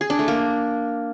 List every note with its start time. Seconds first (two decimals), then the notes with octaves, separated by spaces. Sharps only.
0.01 G#4
0.10 D4
0.19 A3
0.28 A#3